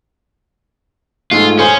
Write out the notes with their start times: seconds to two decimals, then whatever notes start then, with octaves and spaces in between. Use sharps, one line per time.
1.31 G#2 G#3 A3 F4
1.59 C#4 G#4 C5 F5